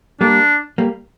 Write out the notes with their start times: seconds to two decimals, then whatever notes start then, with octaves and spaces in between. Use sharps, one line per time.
0.21 G3 A#3 D4
0.78 G3 A#3